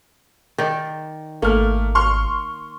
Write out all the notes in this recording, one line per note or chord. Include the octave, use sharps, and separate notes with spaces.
D#3 D5
G#1 A3 A#3 F6
C6 C#6 F6